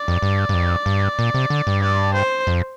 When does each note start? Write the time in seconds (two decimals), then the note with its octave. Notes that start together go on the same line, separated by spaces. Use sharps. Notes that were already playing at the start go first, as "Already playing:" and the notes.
Already playing: D5
0.08 F2
0.22 G2
0.49 G2
0.54 F2
0.86 G2
1.19 A#2
1.34 C3
1.50 D3
1.67 G2
1.82 D5
2.14 C5
2.47 F2